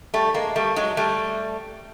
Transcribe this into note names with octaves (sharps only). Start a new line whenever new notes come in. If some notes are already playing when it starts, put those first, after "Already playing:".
G3 A3
G#3 A#3
G3 A3
F#3 G#3
G3 A3